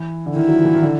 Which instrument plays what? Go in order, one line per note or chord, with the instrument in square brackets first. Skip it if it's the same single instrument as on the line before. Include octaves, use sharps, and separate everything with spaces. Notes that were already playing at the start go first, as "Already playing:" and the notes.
Already playing: [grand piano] E3
D3
[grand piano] D#3 [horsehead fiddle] E4
[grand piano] F#3
F3
E3
D#3
D3